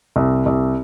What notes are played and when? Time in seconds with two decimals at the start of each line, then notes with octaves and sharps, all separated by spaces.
0.16 C2
0.46 C2